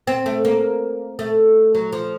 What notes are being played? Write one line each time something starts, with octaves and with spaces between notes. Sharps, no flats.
C4
A3
A#3
A3
F#3
F3